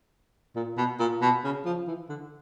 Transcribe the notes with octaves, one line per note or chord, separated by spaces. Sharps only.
A#2
B2
A#2
B2
C#3
F3
E3
D3